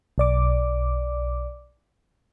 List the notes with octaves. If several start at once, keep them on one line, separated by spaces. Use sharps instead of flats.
B1 D5 D6